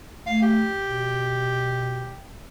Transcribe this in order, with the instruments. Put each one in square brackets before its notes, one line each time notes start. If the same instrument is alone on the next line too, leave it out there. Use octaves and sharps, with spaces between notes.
[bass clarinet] A3 [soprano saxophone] F5
[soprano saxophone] G4
[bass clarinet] B2